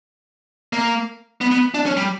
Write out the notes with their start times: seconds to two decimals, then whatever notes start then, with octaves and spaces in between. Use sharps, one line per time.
0.73 A#3
1.41 B3
1.52 B3
1.74 D4
1.86 C#4
1.97 G3